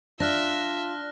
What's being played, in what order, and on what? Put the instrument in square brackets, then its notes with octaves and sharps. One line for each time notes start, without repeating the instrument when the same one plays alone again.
[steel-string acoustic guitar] D4 [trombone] F4 [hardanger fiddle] E5 [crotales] F6 F#6 A#6